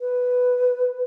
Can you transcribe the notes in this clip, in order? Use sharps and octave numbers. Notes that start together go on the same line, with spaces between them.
B4